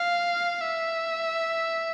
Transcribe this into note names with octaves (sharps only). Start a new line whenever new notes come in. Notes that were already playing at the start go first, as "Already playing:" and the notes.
Already playing: F5
E5